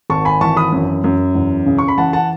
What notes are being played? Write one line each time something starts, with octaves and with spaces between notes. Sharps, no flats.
G#1 A5 C#6
G#5 B5
E3 A5 C#6
B5 D#6
F#2
F#2
E2
C#3
C#6
B5
E3 F#5 A5
F#5 A5